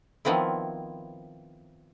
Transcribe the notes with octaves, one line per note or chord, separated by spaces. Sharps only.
D#3 F3 B3 C4 E4